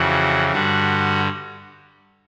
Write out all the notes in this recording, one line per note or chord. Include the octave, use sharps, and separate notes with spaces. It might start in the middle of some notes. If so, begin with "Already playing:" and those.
Already playing: F2 C#3 E3 F#4
G2 D3 G3 F#4